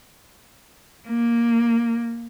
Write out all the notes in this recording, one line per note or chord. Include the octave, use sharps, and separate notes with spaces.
A#3